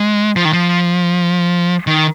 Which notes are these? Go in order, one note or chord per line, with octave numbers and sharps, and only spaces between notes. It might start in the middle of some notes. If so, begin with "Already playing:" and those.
Already playing: G#3
F3
D#3
F3
D#3